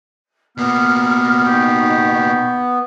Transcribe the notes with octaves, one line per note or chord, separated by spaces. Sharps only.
B2 A#3 B3 F6
D#4 G4 C#6